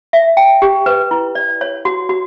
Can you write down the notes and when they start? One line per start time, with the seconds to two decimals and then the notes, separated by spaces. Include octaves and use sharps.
0.13 E5
0.37 G5
0.62 G4
0.86 B4
1.11 E4
1.35 D5
1.61 C#5
1.85 F#4
2.09 F#4